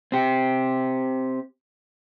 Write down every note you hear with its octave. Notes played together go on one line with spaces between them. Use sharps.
C4 G4